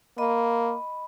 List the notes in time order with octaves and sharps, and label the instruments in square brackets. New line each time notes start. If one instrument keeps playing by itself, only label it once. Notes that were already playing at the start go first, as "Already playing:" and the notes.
[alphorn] A#3 [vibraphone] D#5 B5